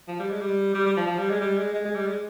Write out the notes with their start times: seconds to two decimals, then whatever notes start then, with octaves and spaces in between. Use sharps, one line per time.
0.08 F3
0.19 G3
0.30 G#3
0.41 G3
0.74 G3
0.86 G3
0.97 F3
1.07 F3
1.18 G3
1.30 G#3
1.40 G3
1.57 G#3
1.74 G#3
1.85 G#3
1.95 G3
2.07 G#3